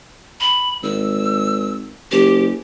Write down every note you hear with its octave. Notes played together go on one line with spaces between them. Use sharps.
B5
G#1 E6
F#1 G4